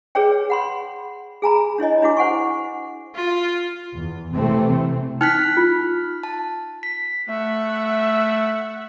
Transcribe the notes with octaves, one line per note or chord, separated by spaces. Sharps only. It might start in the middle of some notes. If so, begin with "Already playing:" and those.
G#4 B4 C#5 D5 G5
F#5 B5 C6
G#4 G#5 A#5 B5
D4 E4 C#5 D#5
D4 E4 F#4 D6
C5 F#5 G#5 C#6
F4
E2
C3 E3 A3 C4
D#4 G5 F6 F#6 B6
F4
A5
B6
A3 E5 F#5